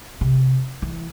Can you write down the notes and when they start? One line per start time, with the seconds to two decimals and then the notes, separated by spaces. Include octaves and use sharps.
0.21 C3
0.82 E3